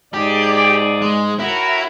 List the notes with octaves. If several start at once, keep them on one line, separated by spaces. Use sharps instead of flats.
D#2 G#2 G4 G#4 D5
G#3
A2 E4 F#4 A#4